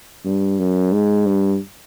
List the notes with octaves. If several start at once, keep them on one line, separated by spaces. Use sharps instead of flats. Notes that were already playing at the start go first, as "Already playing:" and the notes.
G2
F#2
G#2
G2